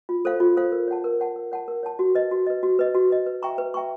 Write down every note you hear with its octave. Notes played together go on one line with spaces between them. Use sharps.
F4
A4 C5 F5
F4
A4 C5 F5
A#4
C#5 F#5 A5
A#4
C#5 F#5 A5
A#4
C#5 F#5 A5
A#4
C#5 F#5 A5
F#4
B4 D#5
F#4
B4 D#5
F#4
B4 D#5
F#4
B4 D#5
B4
E5 G5 A#5 C#6
B4
E5 G5 A#5 C#6